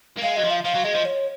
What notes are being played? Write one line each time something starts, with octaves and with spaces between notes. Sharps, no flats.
A#3
G#3 F5
F#3 D#5
F3
F5
F3 F5
F#3
G#3 D#5
F3
C#5